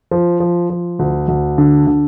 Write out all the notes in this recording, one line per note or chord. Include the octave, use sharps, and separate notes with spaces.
F3
F3
F3
D2
D2
D3
D3